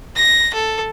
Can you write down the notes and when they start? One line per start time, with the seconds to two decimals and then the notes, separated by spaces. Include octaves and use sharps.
0.16 A#6
0.54 A4